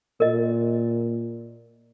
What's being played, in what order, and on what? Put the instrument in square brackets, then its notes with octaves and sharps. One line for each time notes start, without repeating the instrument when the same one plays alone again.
[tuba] A#2 [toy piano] A#4 D#5